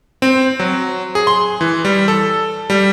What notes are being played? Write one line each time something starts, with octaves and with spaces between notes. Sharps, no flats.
C4
F#3
G#4
C6
E3
G3
A4
G3